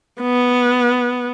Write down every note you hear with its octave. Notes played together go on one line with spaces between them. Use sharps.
B3